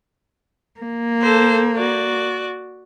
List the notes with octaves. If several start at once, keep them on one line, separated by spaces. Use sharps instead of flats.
A#3
A4 C5
F#4 D5